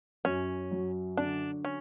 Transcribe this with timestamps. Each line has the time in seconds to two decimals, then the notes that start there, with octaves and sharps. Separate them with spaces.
0.25 F#2 C#4
0.71 F#3
1.17 D3 D4
1.65 C#4